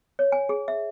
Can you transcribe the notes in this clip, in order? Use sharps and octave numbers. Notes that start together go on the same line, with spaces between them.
C#5
G#5
G#4
E5